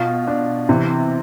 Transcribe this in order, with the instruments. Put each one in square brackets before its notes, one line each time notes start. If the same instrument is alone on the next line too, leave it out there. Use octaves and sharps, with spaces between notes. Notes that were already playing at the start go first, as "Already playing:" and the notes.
Already playing: [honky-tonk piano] B2 [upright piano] F4
[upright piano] D4
[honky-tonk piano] C3 [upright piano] E3